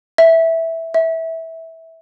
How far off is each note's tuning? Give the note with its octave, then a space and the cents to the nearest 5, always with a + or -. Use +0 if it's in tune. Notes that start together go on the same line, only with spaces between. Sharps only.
E5 -5
E5 -15